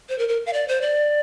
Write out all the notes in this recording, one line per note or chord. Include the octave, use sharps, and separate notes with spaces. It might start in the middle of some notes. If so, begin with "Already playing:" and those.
C5
A#4
A#4
F5
D5
C5
D5